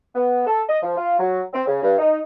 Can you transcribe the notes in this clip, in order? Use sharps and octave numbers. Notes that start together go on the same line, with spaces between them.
B3
A4
D#5
F3
F4
F#3
C4
C#3
G2
D#4